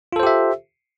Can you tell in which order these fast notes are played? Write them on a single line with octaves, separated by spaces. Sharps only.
F4 A4 C5 G4 E5